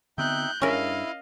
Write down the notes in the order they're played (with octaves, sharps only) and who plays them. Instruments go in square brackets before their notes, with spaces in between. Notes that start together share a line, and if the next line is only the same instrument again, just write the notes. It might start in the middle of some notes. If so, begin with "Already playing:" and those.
[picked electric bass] D3 B3 C4 [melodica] D#4 E5 G5 [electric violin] F#6 G6
[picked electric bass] G2 [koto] C#4 A#4 [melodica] E4 [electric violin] D#5 F5